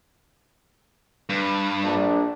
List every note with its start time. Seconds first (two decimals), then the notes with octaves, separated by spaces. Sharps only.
1.29 G2
1.84 A#1 D4